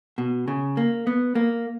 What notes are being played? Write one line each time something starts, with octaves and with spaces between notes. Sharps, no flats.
B2
C#3
A#3
B3
A#3